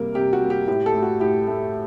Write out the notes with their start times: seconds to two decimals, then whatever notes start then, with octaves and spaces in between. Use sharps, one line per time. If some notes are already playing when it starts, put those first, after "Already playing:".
Already playing: C3 G3 A#3 A#4
0.15 C3 G4
0.33 F#4
0.41 G3 A#3
0.50 G4
0.67 A2 G4
0.86 A4
0.94 A3
1.02 F#4
1.20 A2 G4
1.47 A3